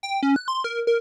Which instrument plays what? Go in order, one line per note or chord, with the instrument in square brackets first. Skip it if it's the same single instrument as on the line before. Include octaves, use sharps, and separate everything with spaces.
[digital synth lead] G5
C#4
F#6
C6
A#4
A#4